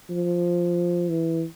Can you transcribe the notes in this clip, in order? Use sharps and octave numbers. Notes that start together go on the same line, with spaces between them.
F3
E3